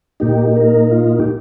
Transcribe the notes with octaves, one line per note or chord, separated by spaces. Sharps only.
A#2 A#3 D#4 G4
G4
A#4
F4
G4